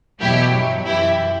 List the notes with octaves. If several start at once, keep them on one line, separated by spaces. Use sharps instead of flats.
E2 B2 F#3 E4 G4
G2 F#3
F#2 E3 E4 G4